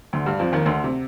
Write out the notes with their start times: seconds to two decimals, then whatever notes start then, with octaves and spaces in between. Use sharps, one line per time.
0.13 D2 D3
0.26 G2 G3
0.39 F2 F3
0.52 D#2 D#3
0.66 D2 D3
0.84 C3